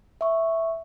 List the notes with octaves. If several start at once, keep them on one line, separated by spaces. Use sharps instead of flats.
E5 C#6